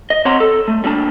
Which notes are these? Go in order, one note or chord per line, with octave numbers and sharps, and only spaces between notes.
D#5
C4 C#5 D#5 F#5 A#5 C6
A4
A3
G3 A#3 D4 A5